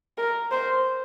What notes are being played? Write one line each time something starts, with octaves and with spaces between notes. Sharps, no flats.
A#4
C5